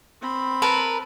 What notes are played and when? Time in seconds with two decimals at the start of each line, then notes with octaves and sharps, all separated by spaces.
0.21 C4 B5
0.62 A#4 B4 A5